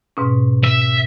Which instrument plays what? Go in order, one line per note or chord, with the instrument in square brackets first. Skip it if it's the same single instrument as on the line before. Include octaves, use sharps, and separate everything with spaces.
[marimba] G#2 B2 C#4
[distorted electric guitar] E5